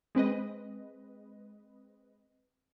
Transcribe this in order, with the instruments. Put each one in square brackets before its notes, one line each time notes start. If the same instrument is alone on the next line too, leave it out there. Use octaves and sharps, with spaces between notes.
[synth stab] G#3 C4 B4 D#5